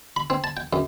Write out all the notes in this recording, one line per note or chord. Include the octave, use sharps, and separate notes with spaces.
B5
C4
A5
G5
F#2